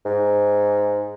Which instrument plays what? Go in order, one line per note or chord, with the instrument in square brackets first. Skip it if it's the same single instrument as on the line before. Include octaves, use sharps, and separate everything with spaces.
[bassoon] G#2